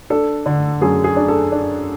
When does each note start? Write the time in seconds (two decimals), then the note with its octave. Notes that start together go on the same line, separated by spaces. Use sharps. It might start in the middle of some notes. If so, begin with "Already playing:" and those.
0.10 D4 A4
0.46 D3
0.81 F#2 G#4
1.04 G#4
1.16 D4
1.28 A4
1.52 D4